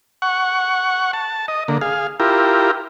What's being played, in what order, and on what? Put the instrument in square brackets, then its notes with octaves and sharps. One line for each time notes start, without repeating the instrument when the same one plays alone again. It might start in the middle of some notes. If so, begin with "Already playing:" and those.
[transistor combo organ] F#5 C#6
A5
D#5
D3 A#3
G#4 F5
E4 F4 G4 A#4